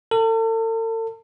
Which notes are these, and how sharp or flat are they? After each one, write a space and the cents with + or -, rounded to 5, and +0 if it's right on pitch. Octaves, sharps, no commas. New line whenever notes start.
A4 +40